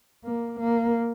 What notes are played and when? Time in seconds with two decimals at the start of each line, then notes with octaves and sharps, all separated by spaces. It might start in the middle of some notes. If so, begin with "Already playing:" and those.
0.24 A#3
0.60 A#3